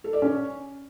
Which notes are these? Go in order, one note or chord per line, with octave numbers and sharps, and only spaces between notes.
A4
D5
C#4